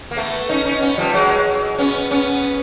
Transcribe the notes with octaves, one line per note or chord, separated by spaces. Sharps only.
A#3
A3 B3
C#4 D#4
C#4 D#4
B3 C#4
F3 G3
F#3 G#3
B3 C#4
B3 C#4